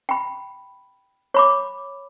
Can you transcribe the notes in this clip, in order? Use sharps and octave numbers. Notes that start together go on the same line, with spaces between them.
G5 B5
C#5 B5 D6